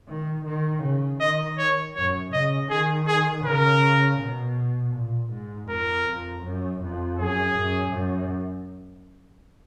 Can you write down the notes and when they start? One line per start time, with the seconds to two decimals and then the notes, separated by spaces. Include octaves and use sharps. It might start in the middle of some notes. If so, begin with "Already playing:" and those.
0.08 D#3
0.45 D#3
0.83 C#3
1.20 D#3 D#5
1.58 C#5
1.95 F#2 C#5
2.32 C#3 D#5
2.70 D#3 G#4
3.07 G#4
3.45 C#3 A#4
4.19 B2
4.94 A#2
5.32 G#2
5.69 F2 A#4
6.06 F2
6.44 F#2
6.82 F2
7.19 F#2 G#4
7.56 F#2
7.93 F#2